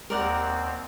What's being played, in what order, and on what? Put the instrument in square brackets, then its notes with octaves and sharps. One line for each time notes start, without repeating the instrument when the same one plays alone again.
[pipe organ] D#2 C4 [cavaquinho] A#4 D5 F#5